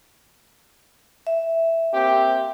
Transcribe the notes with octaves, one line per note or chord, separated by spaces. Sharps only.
E5
A#3 C4 G4